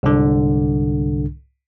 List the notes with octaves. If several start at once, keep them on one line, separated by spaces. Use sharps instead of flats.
C2 G#2 D3